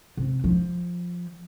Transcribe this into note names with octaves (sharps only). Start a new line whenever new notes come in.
C3
F3